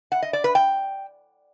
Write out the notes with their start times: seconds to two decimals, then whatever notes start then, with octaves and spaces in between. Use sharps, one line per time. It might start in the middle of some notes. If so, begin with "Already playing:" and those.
0.12 F#5
0.22 D#5
0.33 D5
0.44 B4
0.55 G5